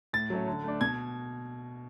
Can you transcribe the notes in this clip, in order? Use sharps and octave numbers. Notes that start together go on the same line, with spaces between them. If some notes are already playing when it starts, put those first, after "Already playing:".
A2 A6
F#3 A3 C#4
D3
A3 D4
B2 G#6